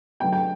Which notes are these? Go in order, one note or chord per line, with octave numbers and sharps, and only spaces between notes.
D3 F#3 B3 G5
G5